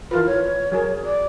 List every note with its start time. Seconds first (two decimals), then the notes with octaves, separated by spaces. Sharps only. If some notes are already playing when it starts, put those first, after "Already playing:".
0.11 E3 F4 A#4 B4
0.26 C#5
0.72 F#3 G#4 A#4
1.04 D5